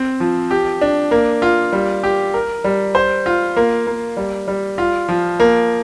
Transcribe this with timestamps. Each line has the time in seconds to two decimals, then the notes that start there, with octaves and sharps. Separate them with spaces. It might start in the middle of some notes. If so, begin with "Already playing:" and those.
Already playing: C4
0.20 F3
0.51 G4
0.81 D4
1.11 A#3
1.42 F4
1.72 G3
2.03 G4
2.34 A#4
2.64 G3
2.95 C5
3.26 F4
3.56 A#3
3.87 A#3
4.17 G3
4.48 G3
4.78 F4
5.09 F3
5.40 A#3